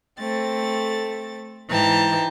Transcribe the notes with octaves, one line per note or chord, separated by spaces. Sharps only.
A3 C4 A6
G#2 E3 G5 A5 A#5